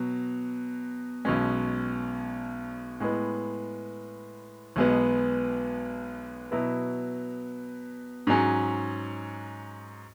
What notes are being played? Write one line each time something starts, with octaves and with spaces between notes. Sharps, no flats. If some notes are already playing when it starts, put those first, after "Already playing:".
Already playing: B2 F#3
B1 B2 G#3 C#4
A2 G#3 B3
B1 B2 G#3 B3
B2 F#3 B3 E4
G#2 F#3 C#4 G#4